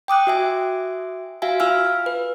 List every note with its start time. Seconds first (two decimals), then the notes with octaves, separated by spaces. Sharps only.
0.08 G5 D6 D#6 F#6
0.27 F#4 E5 G#5
1.42 F#4 E5 F5 G#5
1.60 F4 F5 G#5 E6 F6
2.06 B4